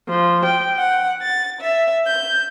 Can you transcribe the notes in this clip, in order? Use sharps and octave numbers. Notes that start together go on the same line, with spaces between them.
F3
G5
F#5
A6
E5
G6